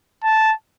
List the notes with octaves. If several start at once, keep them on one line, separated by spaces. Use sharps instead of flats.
A5